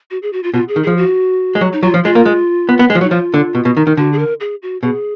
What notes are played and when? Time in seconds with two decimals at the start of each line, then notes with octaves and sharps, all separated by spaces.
0.11 F#4
0.23 G#4
0.33 F#4
0.43 F4
0.54 B2 F4
0.68 G#4
0.76 D#3
0.83 F3 G#4
0.97 F#4
1.55 G#3
1.61 F#3
1.73 D#4
1.83 F#3 F4
1.94 F3
2.05 G#3 F4
2.15 A#3
2.25 G#3
2.69 B3
2.79 B3
2.90 G#3
2.95 F3
3.01 F#3 D#4
3.11 F3 F4
3.34 D3
3.55 B2
3.65 B2
3.77 D#3
3.87 D#3
3.97 D3 F#4
4.13 G#4
4.19 A#4
4.40 G#4
4.62 F#4
4.83 B2 G#4